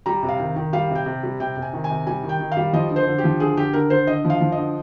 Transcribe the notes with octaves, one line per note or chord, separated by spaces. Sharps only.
G3 A#5
C3
F5
D#3
D#3
G3 F5
C3
G5
C3
G3
C3 G5
C3
G#5
D#3
G#5
C3
G3 G#5
D#3
G5
D#3
F5
G3
F3 D#5
D3
C5
D3
G4
F3
D3 G#4
D3 G4
D3 A#4
D3 C5
D3 D#5
F3
F5
F3
D#5
D3